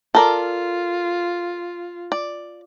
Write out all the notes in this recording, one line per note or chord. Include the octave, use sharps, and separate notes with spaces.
F4 A4 A#4 D5
D5